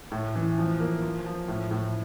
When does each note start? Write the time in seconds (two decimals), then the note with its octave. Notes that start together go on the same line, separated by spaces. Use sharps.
0.12 A2
0.35 E3
0.58 F3
0.80 A#3
1.03 F3
1.26 F3
1.48 A2
1.71 A2